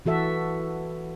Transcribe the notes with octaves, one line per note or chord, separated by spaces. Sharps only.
E3 F#4 A4 E5